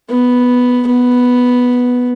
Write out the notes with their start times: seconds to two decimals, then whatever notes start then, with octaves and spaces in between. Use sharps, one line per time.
0.10 B3
0.87 B3